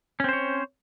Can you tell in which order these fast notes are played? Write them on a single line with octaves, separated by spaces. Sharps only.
C#4 C4 C5 C#5